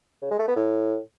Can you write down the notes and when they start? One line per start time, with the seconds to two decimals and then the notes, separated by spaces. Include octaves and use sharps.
0.22 C#3
0.31 G#3
0.39 A3
0.48 B3
0.57 A2